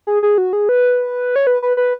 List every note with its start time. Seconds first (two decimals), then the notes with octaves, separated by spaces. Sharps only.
0.07 G#4
0.23 G#4
0.38 F#4
0.53 G#4
0.69 B4
1.36 C#5
1.47 B4
1.62 B4
1.77 B4